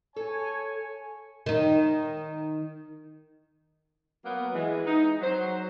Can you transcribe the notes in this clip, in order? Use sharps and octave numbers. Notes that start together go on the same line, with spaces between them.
A4 C#5 G#5
D#3 D#4
F#3 A#3 B3
E3 G#3
D#4
F#3 C5